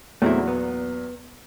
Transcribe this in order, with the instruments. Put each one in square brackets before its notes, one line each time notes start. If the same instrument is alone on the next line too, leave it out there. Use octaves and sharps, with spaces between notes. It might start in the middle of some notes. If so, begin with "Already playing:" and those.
[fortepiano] E2 A#2 F#3 [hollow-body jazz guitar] A3 C4 E4
[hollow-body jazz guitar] B3